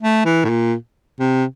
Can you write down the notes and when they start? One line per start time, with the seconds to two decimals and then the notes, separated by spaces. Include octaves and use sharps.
0.02 A3
0.26 E3
0.44 A2
0.49 A#2
1.20 C3